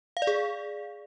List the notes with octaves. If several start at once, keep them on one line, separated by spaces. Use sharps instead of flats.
F5
D5
G#4